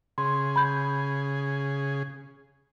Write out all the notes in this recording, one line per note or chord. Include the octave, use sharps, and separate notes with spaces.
C#3 G#4 C6
B5 G6